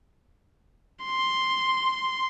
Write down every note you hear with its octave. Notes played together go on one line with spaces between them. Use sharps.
C6